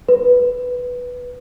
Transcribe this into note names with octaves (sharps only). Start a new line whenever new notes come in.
B4